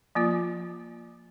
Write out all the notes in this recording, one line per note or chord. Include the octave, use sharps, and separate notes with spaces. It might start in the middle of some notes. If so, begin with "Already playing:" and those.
F3 A#3 F4